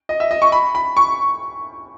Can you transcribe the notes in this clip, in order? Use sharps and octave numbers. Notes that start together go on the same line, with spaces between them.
D#5
E5
D#5
C#6
B5
B5
C#6